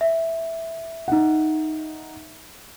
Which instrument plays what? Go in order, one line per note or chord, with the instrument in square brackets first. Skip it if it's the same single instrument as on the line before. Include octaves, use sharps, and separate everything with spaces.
[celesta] E5
[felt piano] D#4 F#5